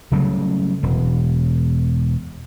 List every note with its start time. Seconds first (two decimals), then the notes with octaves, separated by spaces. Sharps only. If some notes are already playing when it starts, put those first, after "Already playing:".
0.12 C#3 F#3 G3 A3
0.83 E1